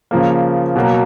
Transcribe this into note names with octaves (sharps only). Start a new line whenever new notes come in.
C#3 F3 A#3
B2 F#3 A#3